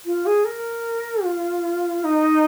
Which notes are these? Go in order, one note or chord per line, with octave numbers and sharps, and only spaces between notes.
F4
G#4
A#4
F4
D#4